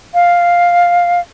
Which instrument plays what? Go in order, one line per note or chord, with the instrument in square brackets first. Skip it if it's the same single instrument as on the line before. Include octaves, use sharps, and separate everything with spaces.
[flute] F5